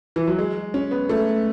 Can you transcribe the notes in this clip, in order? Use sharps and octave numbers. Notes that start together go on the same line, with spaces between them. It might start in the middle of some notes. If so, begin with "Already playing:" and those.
E3
F#3
G#3
C#4
B3
A3